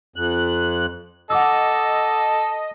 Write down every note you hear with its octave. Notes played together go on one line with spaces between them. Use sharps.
F2 F#6
A4 D#5 F#5 D6 E6